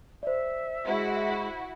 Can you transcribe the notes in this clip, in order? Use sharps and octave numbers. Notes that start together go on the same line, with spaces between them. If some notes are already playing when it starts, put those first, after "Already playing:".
C5 D5 E5
G#3 E4 F#4